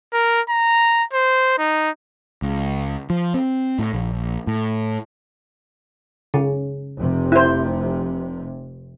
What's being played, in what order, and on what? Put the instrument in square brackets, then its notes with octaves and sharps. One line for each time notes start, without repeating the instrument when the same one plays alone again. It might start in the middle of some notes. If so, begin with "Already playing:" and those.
[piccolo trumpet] A#4
A#5
C5
D#4
[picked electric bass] C#2
F3
C4
A2
A#1
A2
[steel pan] C#3
[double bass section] F1 C3
[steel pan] E4 C5